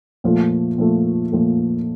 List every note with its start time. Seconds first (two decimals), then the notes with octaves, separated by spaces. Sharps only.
0.24 A#2 F3 A3
0.78 A#2 F3 A3
1.32 A#2 F3 A3